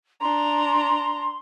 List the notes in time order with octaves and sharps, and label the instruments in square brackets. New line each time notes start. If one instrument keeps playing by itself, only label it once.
[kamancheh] D4 A#5 [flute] C6